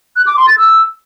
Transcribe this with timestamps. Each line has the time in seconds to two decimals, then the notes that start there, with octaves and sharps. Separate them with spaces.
0.16 F#6
0.27 D6
0.37 C6
0.47 A6
0.58 E6